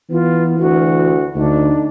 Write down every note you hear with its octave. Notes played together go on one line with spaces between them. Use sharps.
E3 B3 F4
D2 F#4
D2 D4 D#4